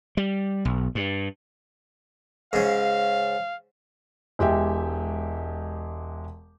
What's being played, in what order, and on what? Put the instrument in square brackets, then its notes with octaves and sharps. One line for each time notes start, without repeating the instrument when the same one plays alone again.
[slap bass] G3
B1
G2
[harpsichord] G#2 C#3 [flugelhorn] F5
[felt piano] E1 G#3 G4 E5 G5